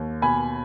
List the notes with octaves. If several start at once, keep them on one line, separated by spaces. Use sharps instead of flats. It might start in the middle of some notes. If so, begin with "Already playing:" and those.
Already playing: D#2
B2 G#5 B5